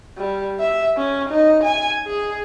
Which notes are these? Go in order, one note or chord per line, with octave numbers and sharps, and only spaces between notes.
G3
E5
C#4
D#4
G#5
G#4